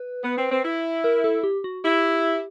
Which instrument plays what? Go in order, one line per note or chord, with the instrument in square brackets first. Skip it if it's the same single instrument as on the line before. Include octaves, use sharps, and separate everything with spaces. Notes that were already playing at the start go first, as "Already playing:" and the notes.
Already playing: [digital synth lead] B4
[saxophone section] B3
C4
C4
E4
[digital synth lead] A#4
A4
G4
F#4
[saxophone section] E4 [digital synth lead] G4